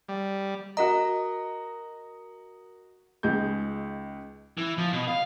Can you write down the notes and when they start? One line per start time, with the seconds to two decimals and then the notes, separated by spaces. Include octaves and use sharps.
0.09 G3
0.77 F#4 A#4 D#5 A#5
3.23 C#2 D#4 G#4 G6
4.58 E3
4.78 F3
4.93 B2
5.08 F5